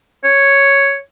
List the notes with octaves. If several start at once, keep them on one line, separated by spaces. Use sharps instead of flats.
C#5